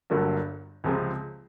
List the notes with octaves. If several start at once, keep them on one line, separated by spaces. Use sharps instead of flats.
G1 G2 D3 F#3 A#3
C#2 C3 F3 G#3 C4